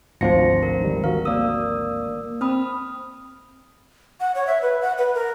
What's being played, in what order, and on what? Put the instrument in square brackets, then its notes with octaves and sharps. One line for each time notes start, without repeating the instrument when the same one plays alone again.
[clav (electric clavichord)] G#1 D2 F3 [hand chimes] C5 C#7 [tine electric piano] A#6
[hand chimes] A#4
[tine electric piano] D#3 G3
[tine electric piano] F#4 A#4 [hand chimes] F5
[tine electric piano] A#3 D#6 [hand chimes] D5 E6
[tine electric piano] C4 [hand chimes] B5 D#6 F6
[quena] F#5
C#5
E5
B4
F#5
B4
A#4